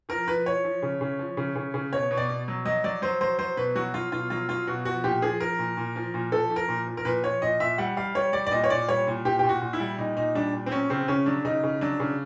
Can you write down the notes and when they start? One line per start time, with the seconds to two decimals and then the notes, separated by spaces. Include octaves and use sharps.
0.09 F3 A#4
0.28 F3 B4
0.46 F3 C#5
0.64 F3
0.83 C#3
1.01 C#3
1.19 F3
1.37 C#3
1.56 C#3
1.74 C#3
1.93 B2 C#5
2.11 B2
2.17 D5
2.29 B2
2.48 F#3
2.66 F#3 D#5
2.84 F#3 D5
3.02 F#3 C5
3.21 F#3 C5
3.39 F#3 C5
3.57 B2 B4
3.75 F#3 F#4
3.94 F#3 F4
4.12 B2 F4
4.30 F#3 F4
4.49 F#3 F4
4.67 B2 F#4
4.85 F3 F#4
5.04 A#2 G4
5.22 F3 G#4
5.40 F3 A#4
5.59 A#2
5.77 A#2
5.96 F3
6.14 A#2
6.32 F3 A4
6.50 F3
6.56 A#4
6.68 A#2
6.87 F3
6.97 A#4
7.05 A#2 B4
7.24 F3 C#5
7.42 A#2 D#5
7.60 A#2 E5
7.78 G3 F#5
7.97 G3 F5
8.15 G3 C#5
8.33 G3 D5
8.47 D5
8.52 A#2 D#5
8.64 C#5
8.70 A#2 D5
8.89 G3 C#5
9.07 A#2
9.25 A#2 G4
9.39 A#2 G4
9.49 F#4
9.61 A#2
9.73 E4
9.80 G3
9.98 A#2 D#4
10.16 A#2 D#4
10.35 G3 D4
10.53 A#2
10.66 C4
10.71 F#3 C#4
10.90 C#3 C4
11.08 C#3 C#4
11.26 F#3 D4
11.45 C#3 D#4
11.64 C#3
11.81 F#3 D4
12.00 C#3